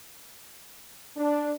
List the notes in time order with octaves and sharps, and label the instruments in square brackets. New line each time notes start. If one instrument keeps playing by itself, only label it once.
[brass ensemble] D4